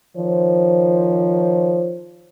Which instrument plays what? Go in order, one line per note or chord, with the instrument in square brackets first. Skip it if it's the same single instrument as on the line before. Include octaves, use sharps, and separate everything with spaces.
[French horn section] D#3 F3 C5 C#5